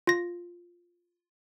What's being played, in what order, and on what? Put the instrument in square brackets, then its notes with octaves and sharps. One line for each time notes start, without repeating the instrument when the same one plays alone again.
[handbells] F4 A#6